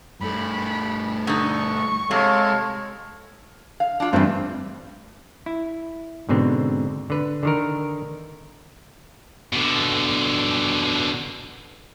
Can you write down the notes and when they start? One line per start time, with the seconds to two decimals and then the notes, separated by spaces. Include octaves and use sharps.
0.21 G2 A3 B5
1.27 D3 D#4 C#6
2.11 C3 G#3 A4 C#5 F5
3.80 F5
4.00 D4 F4
4.13 G2 E3 C4 F4
5.46 E4
6.29 G#2 B2 D3 C4
7.10 D3 B4
7.43 D3 D#3 A#4
9.53 B2 D3